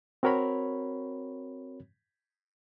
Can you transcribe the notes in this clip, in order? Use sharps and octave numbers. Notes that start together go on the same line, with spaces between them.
C4 F#4 A#4 C#5 B5